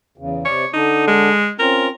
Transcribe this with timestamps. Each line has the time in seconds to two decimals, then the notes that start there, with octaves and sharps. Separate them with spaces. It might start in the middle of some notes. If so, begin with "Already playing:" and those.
0.18 E2 C#3
0.45 C3 C#5 D5
0.74 D3 D4 D#4
1.07 G#3
1.59 C4 C#4 F4 A#4